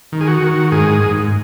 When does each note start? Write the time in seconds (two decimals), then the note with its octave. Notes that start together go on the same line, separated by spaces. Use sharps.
0.12 D#3
0.21 G#4
0.28 F#4
0.42 D#3
0.72 G#2 G#4
1.01 G#2